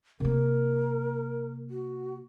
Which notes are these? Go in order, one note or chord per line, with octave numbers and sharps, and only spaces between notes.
C3 A#3 A#4
F#4